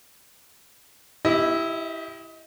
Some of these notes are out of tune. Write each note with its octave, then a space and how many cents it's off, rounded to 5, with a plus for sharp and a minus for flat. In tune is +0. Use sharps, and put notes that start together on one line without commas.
E4 +0 G4 +0 D#5 +35